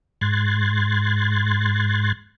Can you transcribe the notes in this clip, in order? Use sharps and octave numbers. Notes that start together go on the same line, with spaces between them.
G#2 C6 F#6 G#6 A6